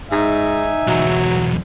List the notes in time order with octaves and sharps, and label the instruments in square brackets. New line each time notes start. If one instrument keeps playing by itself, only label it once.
[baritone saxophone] G#2 [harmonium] D#4 G#5 [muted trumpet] E5
[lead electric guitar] B1 E2 [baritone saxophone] F#3